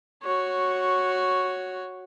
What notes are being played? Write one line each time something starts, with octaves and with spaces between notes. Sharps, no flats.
F#4 C#5